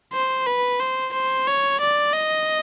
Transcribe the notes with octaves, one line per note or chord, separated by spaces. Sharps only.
C5
B4
C5
C5
C#5
D5
D#5